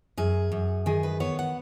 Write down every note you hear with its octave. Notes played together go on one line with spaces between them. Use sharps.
F#2 G#4
F#2
D#3 G#4
B4
B3 C#5
F#5